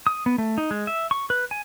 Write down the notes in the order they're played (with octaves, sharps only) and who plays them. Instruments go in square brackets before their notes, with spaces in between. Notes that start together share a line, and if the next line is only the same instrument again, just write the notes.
[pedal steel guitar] D#6
B3
A3
D#4
G#3
E5
C#6
B4
G#5